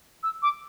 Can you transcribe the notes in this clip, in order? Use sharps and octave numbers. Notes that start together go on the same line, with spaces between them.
E6
D6